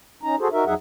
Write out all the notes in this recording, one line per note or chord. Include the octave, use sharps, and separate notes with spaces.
C#4 D#4 A#5
F#4 G#4 A4 C5
D#4 F#4 A#4 E5
F2 F#3 D#4 G#4 E5 F#5